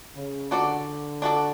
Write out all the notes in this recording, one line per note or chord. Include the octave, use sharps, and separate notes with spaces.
C#3
D3 D4 F#4 A4 D5
D4 F#4 A4 D5